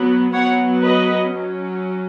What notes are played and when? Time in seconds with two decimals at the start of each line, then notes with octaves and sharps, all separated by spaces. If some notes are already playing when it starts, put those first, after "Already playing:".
Already playing: F#3 B3
0.33 F#3 B3 C#5 F#5
0.83 B4 D#5
1.33 F#3 C#4